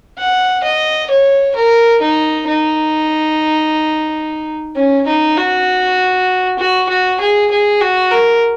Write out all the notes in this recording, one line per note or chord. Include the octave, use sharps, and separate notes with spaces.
F#5
D#5
C#5
A#4
D#4
D#4
C#4
D#4
F#4
F#4
F#4
G#4
G#4
F#4
A#4